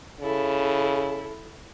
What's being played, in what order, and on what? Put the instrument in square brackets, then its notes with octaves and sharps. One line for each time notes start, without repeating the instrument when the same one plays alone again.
[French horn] C#3 [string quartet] E4 A4